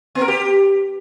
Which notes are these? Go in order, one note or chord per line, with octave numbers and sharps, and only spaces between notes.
B3
A#4
G4